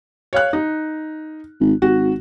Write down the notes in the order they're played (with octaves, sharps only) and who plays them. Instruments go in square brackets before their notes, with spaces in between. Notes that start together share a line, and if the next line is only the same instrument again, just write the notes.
[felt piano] C#5 F5 F#6
D#4
[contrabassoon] G#1
[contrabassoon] G#1 [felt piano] F#4